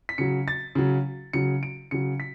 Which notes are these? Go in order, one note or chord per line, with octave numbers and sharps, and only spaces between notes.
B6
C#3 F#3 C#7
A6
C#3 F#3
C#3 F#3 C#7
D7
C#3 F#3 C#7
B6